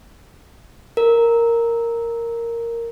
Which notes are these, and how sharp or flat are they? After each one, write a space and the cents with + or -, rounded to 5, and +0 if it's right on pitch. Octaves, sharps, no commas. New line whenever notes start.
A#4 -5